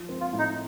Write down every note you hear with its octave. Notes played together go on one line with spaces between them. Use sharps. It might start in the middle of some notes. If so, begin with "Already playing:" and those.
Already playing: F3
C4
F4
A2
D#4